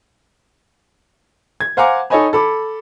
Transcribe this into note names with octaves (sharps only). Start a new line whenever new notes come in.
G#6
C5 F5 F#5 G#5 A#5 D6
D#4 A4 C#5 D#5 G#5 B5
A4 B5 D6